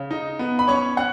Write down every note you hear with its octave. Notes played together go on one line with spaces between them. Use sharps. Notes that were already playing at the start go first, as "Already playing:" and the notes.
Already playing: C#3
D#4
B3
B5
C#4 C#5 C#6
C#4 F#5 F#6